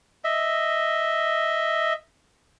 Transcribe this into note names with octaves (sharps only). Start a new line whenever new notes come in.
D#5 E5